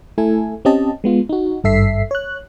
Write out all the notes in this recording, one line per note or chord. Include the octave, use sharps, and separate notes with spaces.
A3 E4 A4 G#5
C4 C#4 G4 D#5 A5
G#3 B3 F4
D#4 F#4
G#1 G2 A4 E5 B6 C7
C#5 F#6